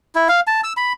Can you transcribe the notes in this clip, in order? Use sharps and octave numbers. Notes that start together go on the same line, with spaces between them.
E4
F5
A5
E6
B5